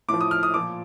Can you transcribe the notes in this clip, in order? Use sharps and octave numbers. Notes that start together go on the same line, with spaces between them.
A2 F3 D6
D#6
F6
D#6
A#2 F3 D6